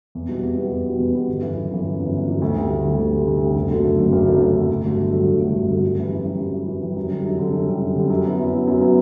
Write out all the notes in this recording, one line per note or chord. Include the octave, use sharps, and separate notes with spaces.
E2
B2 G3 B3
E2
B2 G3 B3
E2
B2 G3 B3
E2
B2 G3 B3
G1
F#2 E3
G1
F#2 E3
G1
F#2 E3
G1
F#2 E3
D2
D3 G3
D2
D3 G3
D2
D3 G3
D2
D3 G3
F#1
F#2 D3 F#3 A3
F#1
F#2 D3 F#3 A3
F#1
F#2 D3 F#3 A3
F#1
F#2 D3 F#3 A3
G1
G2 D3 F#3 A3
G1
G2 D3 F#3 A3
G1
G2 D3 F#3 A3
G1
G2 D3 F#3 A3
F#2
E3 G3
F#2
E3 G3
F#2
E3 G3
F#2
E3 G3
F#2
D3 G3
F#2
D3 G3
F#2
D3 G3
F#2
D3 G3
F#2
F#3 B3 E4
F#2
F#3 B3 E4
F#2
F#3 B3 E4